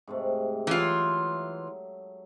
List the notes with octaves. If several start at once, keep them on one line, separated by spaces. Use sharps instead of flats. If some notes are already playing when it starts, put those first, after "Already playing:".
G#2 C3 A3
E3 F#3 F4